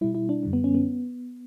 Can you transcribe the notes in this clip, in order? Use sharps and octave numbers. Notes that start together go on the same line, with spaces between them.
B2 G3 E4
E4
D4
F#2 D3 G3
B3
C#4
B3